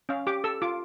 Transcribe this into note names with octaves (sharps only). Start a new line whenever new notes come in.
C#4 F5
G4 D6
A4 E6
F4 D6